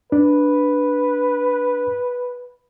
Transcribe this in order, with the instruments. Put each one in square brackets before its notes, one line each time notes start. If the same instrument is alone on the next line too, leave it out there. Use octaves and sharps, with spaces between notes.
[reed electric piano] D4 [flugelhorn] B4